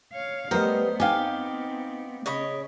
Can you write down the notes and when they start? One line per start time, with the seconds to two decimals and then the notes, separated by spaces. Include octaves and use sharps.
0.13 C#5 F5
0.51 G3 A3 B3 A#4 C5 D#5
1.00 B3 C4 D#4 G4 F5 G5 G#5
2.26 C#3 C#5 D#5 B5